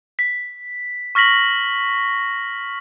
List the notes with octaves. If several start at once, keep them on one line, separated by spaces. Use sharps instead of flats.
B6
C#6 F6 A#6 B6 F#7